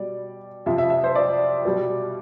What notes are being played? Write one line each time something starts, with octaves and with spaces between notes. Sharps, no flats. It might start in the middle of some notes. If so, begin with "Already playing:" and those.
Already playing: B2 G3 D5
F2 C3 F3 E5
E5
E5
C5
D5
B2 G3